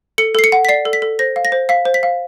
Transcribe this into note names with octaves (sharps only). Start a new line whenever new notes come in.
A4 C#7
A4 C7
C#7
F#5
B6
D5 C7
A4
B6
A4
C5 A#6
F5
A#6
C5
F5 B6
C5
B6
F5